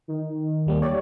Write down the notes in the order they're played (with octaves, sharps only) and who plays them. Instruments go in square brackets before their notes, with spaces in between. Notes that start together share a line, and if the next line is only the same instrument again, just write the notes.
[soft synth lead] D#3
[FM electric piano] D#2 G3 A#3
[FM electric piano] G4 C#5 [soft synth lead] D5